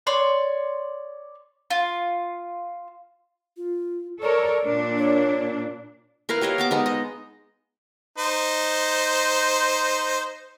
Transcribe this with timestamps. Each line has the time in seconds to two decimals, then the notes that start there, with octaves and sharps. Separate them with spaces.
0.07 C#5 D5 C6
1.70 F4
3.57 F4
4.22 A4 A#4 C#5 D5
4.65 A#2 D4
4.99 C#5
6.29 E4 A#4 B4 F5
6.41 G4 C#5 D#5 F5
6.58 B3 A5 D6
6.71 G#3 B3 D#4
6.86 D#5
8.18 D#4 C5